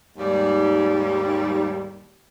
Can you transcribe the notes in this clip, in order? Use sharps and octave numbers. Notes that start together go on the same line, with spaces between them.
D#2 G#2 G3